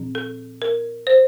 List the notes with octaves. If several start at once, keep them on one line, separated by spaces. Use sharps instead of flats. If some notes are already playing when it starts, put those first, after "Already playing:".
Already playing: A#2 F3 C4
A4
A#4
C5